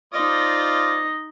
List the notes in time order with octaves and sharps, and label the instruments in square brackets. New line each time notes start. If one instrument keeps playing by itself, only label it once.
[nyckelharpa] D#4 D#5 [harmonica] F4 C5 D5